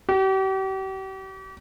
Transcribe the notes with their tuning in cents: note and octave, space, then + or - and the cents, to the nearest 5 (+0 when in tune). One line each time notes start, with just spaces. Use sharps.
G4 -40